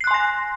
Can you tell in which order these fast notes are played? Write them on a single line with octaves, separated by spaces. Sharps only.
C7 F#6 C6 G#5 A#6